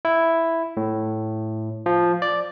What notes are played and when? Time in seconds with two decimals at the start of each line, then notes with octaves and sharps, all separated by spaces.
0.05 E4
0.77 A2
1.86 F3
2.22 D5